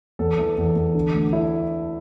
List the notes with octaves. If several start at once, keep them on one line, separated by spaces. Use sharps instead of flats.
E2 A4
E3
E2
E2
D3
D2
D3 E4